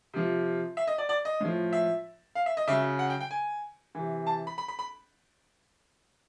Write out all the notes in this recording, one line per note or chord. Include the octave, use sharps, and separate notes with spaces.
C3 F3
E5
D#5
D5
D5
D#5
A2 F3
E5
F5
E5
D#5
C#3 F#3 E5
F#5
G5
G5
G#5
C3 E3
A5
B5
B5
B5
B5